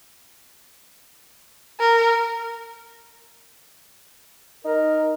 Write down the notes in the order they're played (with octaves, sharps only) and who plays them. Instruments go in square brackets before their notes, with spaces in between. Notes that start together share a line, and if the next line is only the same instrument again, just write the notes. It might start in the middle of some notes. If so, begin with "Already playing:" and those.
[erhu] A#4
[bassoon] D#4 [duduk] A#4